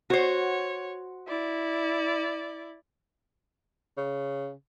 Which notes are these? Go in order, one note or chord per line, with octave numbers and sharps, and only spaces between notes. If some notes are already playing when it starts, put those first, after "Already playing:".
F#4 C5 C#5
E4 D5
C#3